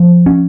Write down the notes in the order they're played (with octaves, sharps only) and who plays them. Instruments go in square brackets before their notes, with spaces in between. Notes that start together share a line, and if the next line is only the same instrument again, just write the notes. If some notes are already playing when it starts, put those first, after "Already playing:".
Already playing: [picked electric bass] F3
C#4